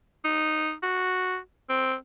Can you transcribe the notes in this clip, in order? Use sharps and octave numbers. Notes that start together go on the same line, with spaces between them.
D#4
F#4
C4